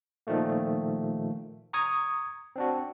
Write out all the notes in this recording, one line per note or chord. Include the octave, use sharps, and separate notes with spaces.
A#2 D#3 F3 A3 A#3
A#5 C#6 D#6 G#6
C4 D4 F#4